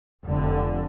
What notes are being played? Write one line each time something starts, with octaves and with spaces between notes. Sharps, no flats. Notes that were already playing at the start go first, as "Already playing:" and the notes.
F1 D3